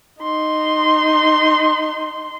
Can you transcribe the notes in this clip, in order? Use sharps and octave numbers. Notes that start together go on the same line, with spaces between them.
D#4 C6